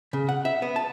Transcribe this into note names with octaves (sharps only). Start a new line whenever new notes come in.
C#3
F#5
E5
B3
A5